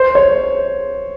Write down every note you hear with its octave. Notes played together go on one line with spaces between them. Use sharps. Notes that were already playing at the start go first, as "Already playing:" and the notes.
Already playing: C5
C#5